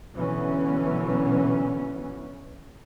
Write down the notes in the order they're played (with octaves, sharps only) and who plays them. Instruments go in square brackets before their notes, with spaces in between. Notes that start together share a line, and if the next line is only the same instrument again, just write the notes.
[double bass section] B2 D3 E3 F#3 B3 C#4